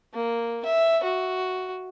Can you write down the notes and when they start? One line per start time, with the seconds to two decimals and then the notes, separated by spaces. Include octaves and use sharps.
0.14 A#3
0.65 E5
1.03 F#4